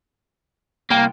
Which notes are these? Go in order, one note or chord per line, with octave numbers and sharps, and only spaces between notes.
C2 A#3 G5